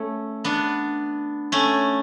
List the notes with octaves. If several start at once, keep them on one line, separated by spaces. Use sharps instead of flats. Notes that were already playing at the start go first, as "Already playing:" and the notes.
Already playing: A3 C#4
B3 D4
A3 C#4